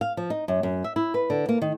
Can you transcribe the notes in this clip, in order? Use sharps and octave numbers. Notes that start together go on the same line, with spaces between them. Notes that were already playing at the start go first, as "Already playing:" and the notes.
F5
F3
D#4
F#2
F#2
E5
E4
B4
D3
A#3
D#3